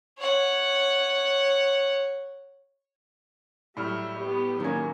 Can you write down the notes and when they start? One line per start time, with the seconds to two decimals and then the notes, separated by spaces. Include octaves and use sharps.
0.18 C#5 F#5
3.77 A2 F#3 G3 E5 F6
4.20 B3 G4
4.60 D#3 F#3 A#3 C#4